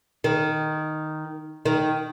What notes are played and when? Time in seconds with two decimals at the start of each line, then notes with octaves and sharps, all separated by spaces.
0.24 D#3
1.65 D#3